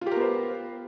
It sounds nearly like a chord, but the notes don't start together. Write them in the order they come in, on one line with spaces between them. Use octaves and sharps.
F4 G4 A#4 B3 C5